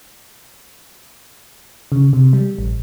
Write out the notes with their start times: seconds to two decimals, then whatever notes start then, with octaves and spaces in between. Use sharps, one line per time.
1.92 C#3
2.13 C3
2.33 G3
2.58 A1